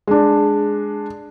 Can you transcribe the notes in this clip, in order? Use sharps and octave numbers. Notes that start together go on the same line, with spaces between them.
G#3 D4